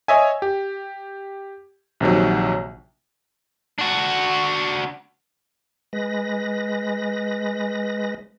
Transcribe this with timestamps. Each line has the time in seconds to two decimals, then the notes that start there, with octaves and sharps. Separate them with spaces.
0.08 C#5 D#5 E5 G#5
0.42 G4
2.00 A#1 C3 D#3 F#3
3.79 D4 F#4
5.93 G#3 B4 A#6